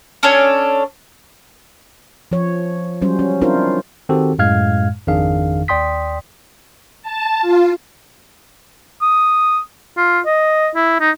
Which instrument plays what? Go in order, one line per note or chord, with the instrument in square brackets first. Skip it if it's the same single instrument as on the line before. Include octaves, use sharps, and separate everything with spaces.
[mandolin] C#4 D4 A4 C#5
[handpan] F3 C#5
F#3 G3 C#4 C5
C#4
C4 D4 E4 F4 A#4 C5
[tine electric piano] D#3 C4 F#4 G4 A4
F#2 A2 G#3 F5 F6 G#6
G#1 F2 D#3 D4 G#4 F5
D#2 D5 G5 C6 D#6 B6
[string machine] A5
F4
[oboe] D#6
F4
D#5
E4
D#4